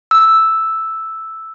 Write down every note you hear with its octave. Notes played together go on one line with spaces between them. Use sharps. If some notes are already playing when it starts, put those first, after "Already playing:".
E6